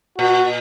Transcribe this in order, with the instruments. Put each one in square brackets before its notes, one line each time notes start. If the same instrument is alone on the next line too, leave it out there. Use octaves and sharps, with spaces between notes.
[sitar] A#2 [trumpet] F#4